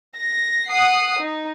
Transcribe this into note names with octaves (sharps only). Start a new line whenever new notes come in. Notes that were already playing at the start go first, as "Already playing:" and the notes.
A#6
F#5 D#6 C7
D#4